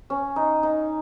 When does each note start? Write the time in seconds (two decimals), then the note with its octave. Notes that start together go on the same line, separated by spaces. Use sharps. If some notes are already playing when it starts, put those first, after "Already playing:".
0.10 C#4
0.36 D#4
0.63 D#4